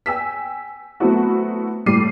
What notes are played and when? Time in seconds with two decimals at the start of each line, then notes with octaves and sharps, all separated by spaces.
0.06 G5 G#5 E6 B6
1.00 F#3 A3 B3 C4 E4 F#4
1.86 A2 G3 A4 D6 C7 D#7